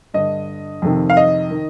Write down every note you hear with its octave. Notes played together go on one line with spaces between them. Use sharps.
G2 D3 D#5
F2 C3 D#3
F5
D#5
D#3